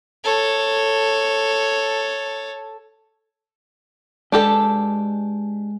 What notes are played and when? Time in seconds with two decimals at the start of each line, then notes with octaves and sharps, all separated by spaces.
0.24 A4 C#5
4.32 G#3 D4 G4 A4 B4 B5